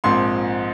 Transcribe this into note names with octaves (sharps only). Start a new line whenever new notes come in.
A#1 G#2 F3 C4 C6